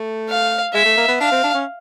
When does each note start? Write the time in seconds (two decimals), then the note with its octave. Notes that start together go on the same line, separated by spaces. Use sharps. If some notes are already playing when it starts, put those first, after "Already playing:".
Already playing: A3
0.29 F5
0.74 G#3 E5
0.85 A3
0.97 A#3
1.08 B3
1.20 D4 F5
1.32 C4
1.44 D4
1.54 C#4